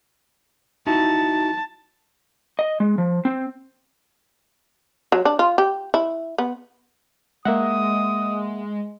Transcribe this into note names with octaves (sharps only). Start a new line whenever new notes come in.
D#4 E4 F#4 A5
D#5
G#3
F3
C4
F#3
D4
F4
G4
E4
B3
G#3 A#3 E5 F#5 D#6